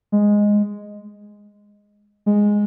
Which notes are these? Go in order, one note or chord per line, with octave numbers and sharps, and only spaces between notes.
G#3
G#3